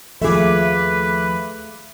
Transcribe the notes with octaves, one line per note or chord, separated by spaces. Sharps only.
D#2 F3 A3 G#4 B4 E5 F5 D6